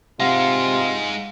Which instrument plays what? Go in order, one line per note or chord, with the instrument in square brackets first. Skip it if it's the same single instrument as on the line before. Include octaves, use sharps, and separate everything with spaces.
[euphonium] C3 [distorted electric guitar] G#3 D#4 [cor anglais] F4 [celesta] F5 F#5